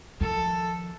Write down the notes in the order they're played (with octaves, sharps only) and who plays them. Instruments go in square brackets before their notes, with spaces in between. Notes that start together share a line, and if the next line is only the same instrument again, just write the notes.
[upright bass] D#3 F3 [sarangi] A4